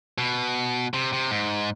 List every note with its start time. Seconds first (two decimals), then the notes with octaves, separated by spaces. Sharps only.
0.18 B2
0.94 C3
1.13 C3
1.31 G#2